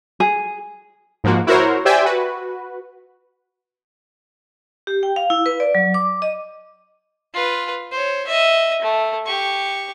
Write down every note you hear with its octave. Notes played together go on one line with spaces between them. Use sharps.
G#4
G#2 F3 A#3 F#4
E4 F#4 A#4 C5 C#5
G4 C5 D5 E5 G5 G#5
F#4 B4
G4
G5
F5
E4
B4
D5
F#3
D6
D#5
F4 B4
C5 C#5
D#5 E5
A3
G4 C#6